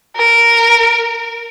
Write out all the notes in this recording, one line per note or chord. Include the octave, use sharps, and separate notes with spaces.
A#4